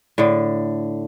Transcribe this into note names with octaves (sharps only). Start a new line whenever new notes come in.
A2 D3